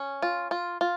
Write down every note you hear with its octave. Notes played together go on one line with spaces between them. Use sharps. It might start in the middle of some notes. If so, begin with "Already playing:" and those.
Already playing: C#4
F4
F4
F4